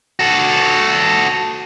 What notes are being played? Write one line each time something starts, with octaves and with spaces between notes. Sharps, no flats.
F#4 A4